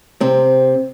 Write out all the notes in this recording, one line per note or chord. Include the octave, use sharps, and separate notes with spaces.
C3 C4